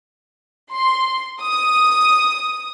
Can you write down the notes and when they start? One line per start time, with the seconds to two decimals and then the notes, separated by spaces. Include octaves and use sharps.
0.71 C6
1.41 D#6